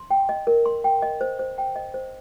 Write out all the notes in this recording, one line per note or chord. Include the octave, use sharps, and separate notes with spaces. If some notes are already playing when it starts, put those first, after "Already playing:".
Already playing: C6
G5
D#5
A#4
C6
G5
D#5
C5
C5
G5
D#5
C5